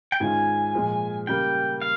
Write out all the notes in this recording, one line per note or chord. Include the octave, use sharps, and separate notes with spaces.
G5
G#2 D#3 G#3 C#4 F4 G#5
A#2 F3 G#3
C#3 G3 A#3 G5
F5